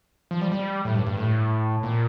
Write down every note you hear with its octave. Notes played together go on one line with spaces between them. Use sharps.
F3
G3
G3
A2
G2
G2
A2
A#2